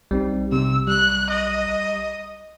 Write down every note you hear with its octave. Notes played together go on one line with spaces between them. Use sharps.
B1 G3 C4 D#4
C3 G3 E6
G3 F#6
D#5